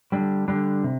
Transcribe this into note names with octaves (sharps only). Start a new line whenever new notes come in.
D3 G3 D4
D3 G3 D4
C3